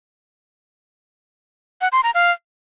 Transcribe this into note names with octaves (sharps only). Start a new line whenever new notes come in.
F#5
C6
A#5
F5